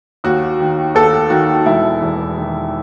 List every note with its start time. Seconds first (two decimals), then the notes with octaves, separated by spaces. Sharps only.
0.24 D#2 F#4
0.60 D#3
0.95 D#2 A4
1.30 D#3 F#4
1.66 E1 E4
2.02 E2
2.38 D#3